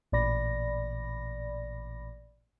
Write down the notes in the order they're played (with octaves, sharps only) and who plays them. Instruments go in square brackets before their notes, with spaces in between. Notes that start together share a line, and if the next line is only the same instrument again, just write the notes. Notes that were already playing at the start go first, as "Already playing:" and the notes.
[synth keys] A1 A#2 D5 B5 A#6